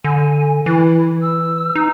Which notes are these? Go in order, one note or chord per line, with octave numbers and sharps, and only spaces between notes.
D3 G#5
E3 E4
E6
D#4